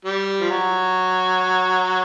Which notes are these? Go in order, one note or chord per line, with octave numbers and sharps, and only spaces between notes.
G3
F3
F#3